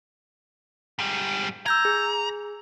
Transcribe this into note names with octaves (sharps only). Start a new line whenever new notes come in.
G#2 G3
A#5 E6 G6 G#6
G#4